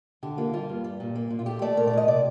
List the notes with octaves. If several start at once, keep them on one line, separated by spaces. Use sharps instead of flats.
D3 G4
A#3 F4
G3 F4
G2
G3
A#2
A#3
A#2
F4
A3 G4
A3 D5
A#2 A#4
D5
A#2 D#5
C3 D5